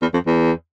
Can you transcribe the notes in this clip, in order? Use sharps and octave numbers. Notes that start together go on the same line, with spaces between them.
E2
F2
E2